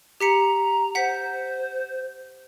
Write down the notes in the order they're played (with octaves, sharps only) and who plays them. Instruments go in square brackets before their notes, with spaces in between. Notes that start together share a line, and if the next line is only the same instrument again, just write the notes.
[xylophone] G4 B6 C#7 [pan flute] A#5
[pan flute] C5 [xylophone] F#5 B6